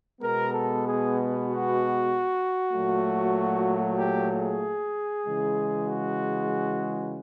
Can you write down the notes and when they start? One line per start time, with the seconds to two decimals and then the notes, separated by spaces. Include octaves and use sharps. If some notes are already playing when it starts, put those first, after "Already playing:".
0.21 B2 G#3 B3 A#4
0.53 A4
0.85 G#4
1.47 F#4
2.73 A#2 F#3 A3
3.99 G4
4.31 G#4
5.25 C#3 E3 G#3
5.88 F#4